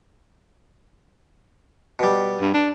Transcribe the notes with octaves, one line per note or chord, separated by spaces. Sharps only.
B2 G3
G2
D4